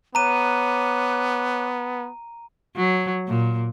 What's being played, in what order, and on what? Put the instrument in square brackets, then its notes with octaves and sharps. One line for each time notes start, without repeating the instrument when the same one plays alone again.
[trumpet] B3 [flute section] C#5 D6 F#6 [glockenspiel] A#5 D#7
[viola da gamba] F#3
A#2